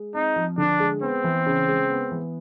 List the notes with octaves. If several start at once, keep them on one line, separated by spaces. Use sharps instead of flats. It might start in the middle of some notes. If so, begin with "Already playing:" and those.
Already playing: G#3
C4 D#4
F3
D3 D4
G#3
B3 C4
E3
C#3
G#3
B3
E3